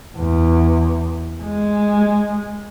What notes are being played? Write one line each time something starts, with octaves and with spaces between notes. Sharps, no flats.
E2
G#3